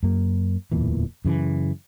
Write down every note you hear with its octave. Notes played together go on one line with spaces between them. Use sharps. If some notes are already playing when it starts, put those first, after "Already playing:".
F#2 A#3
D1 E2 A#2 E3
F#2 C#3 E3